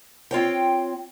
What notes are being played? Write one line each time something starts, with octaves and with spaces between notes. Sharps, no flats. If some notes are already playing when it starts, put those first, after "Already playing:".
C4 F4 C#5 G5